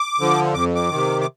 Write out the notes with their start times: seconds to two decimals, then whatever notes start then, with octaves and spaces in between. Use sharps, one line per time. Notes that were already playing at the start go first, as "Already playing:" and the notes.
Already playing: D6
0.19 D3 F3
0.54 F2 D6
0.75 D6
0.90 C3 D#3
1.21 D6